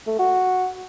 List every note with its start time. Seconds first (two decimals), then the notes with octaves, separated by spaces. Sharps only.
0.07 A3
0.19 F#4